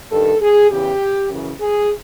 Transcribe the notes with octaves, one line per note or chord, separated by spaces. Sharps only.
G2 D#3 A4
G#4
E2 C#3 E3 G4
F#2 C#3 E3
G#4